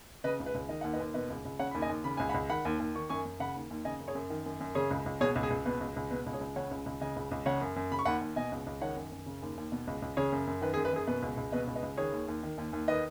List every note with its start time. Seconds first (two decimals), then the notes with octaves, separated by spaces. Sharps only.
0.24 C#3 B4 D#5
0.40 C#2
0.46 B4
0.54 C#2
0.69 D#3 D#5
0.81 D#2 F#5
0.93 B4 D#5
1.00 D#2
1.14 B2 B4 D#5
1.30 C#2
1.45 C#2
1.59 C#3 C#5 F#5
1.71 D#2 B5
1.82 D#5 G#5
1.89 D#2
2.04 C#3 B5
2.17 C#2 G#5
2.29 F#5 B5
2.34 C#2
2.50 D#3 F#5 B5
2.65 D#2
2.80 D#2
2.95 D#3 C#6
3.10 F#2 G#5 C#6
3.25 F#2
3.40 C#3 F#5 B5
3.55 D#2
3.70 D#2
3.85 C#3 D#5 G#5
4.00 F#2
4.08 G#4 C#5
4.15 F#2
4.30 D#3
4.46 F#2
4.60 F#2
4.75 C#3 G#4 C#5
4.90 C#2
5.06 C#2
5.21 B2 G#4 C#5
5.35 C#2
5.43 G#4
5.50 C#2
5.65 B2 B4
5.80 C#2
5.96 C#2
6.11 B2 B4
6.26 C#2
6.33 G#4 C#5
6.41 C#2
6.56 C#3 C#5 F#5
6.71 C#2
6.86 C#2
7.01 C#3 D#5 G#5
7.16 C#2
7.31 C#2
7.46 C#3 C#5 F#5
7.61 F#2
7.76 F#2
7.91 C#3 B5
7.99 C#6
8.05 D#2 F#5 B5
8.21 D#2
8.36 B2 D#5 G#5
8.52 C#2
8.66 C#2
8.81 D#3 C#5 F#5
8.97 F#2
9.12 F#2
9.26 C#3
9.42 D#2
9.57 D#2
9.72 B2
9.87 C#2
10.02 C#2
10.17 C#3 G#4 C#5
10.32 F#2
10.47 F#2
10.62 D#3 B4
10.74 G#4
10.77 F#2
10.85 B4
10.93 F#2 G#4
11.07 B2 B4
11.22 C#2
11.37 C#2
11.52 B2 B4 D#5
11.67 C#2
11.75 B4 D#5
11.82 C#2
11.97 D#3 G#4 C#5
12.13 D#2
12.28 D#2
12.43 D#3
12.58 D#2
12.73 D#2
12.88 D#3 B4 D#5